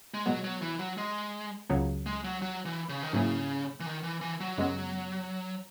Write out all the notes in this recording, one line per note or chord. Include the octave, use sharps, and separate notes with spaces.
G#3
B2 F#3 G#3 B3
F#3
E3
F#3
G#3
C#2 C#3 F#3
G#3
F#3
F#3
E3
C#3
D#3
G#2 C#3 F#3 A#3 E4 G#4
E3
D#3
E3
E3
F#3
F#2 C#3 G#3 B3